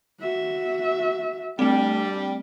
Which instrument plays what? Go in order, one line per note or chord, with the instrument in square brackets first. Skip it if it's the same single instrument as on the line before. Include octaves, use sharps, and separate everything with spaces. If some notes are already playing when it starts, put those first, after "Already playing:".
[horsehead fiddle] F#4 E5
[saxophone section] G3 [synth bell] A3 C4 [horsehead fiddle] D4